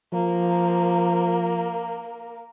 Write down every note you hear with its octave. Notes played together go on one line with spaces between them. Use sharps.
F3 A#3 A#4